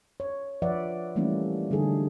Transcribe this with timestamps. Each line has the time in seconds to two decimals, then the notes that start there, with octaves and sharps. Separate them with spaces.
0.20 C#5
0.62 F3 B4 D5 E5 F#5
1.16 E3 G3 A3 A#3 C#4 E4
1.71 D3 G3 D#4 G#4 A4